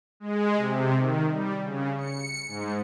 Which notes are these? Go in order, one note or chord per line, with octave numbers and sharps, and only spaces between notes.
G#3
C3
D#3
G3
C#3
C#7
G#2